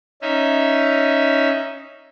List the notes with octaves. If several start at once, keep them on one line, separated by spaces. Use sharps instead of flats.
C#4 D#4 E5